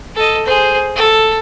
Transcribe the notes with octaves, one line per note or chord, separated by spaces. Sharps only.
A4 D#5
G#4 C5
A4